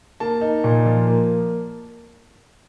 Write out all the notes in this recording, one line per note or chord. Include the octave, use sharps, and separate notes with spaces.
A#3 A5
D#4
A#2
F3
A#3